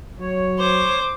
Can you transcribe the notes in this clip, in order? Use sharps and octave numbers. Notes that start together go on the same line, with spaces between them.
F#3 C#5
C5 D6